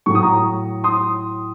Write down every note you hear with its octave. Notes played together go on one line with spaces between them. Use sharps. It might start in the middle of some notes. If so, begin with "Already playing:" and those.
A2 F#3 C#6
D#6
A#5 C#6
C6 D#6